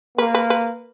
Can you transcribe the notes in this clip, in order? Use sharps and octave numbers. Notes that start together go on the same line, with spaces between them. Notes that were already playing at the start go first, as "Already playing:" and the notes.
A#3 B4
B4
B4